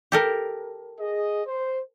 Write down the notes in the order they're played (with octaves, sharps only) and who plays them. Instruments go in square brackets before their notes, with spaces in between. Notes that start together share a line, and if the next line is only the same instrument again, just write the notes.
[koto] G4 A4 A#4
[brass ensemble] G#4 D#5
C5